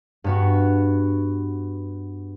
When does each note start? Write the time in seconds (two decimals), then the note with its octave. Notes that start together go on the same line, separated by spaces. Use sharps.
0.24 G2 B3 F#4